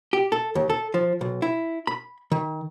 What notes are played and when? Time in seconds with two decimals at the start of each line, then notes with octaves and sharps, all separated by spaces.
0.13 G4
0.32 A4
0.55 D#2
0.70 A4
0.94 F3
1.21 B1
1.42 E4
1.87 B5
2.32 D#3